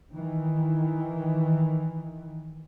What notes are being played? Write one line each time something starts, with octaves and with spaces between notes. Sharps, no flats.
D#3 E3